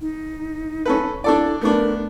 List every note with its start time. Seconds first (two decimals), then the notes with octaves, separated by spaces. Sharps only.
0.01 D#4
0.85 C#4 A4 B4
1.24 D4 E4 A4 D5
1.61 A3 B3 D4 A#4